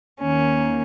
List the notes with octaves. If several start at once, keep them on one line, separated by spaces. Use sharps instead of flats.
D#2 D#3 A#3 C#4